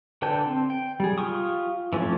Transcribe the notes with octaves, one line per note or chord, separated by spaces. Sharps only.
D3 B4 G5 A5 G6
C4
G5
G3 G#4
F4 G4 C#6 D#6
E3 F3 A3 C4 C#4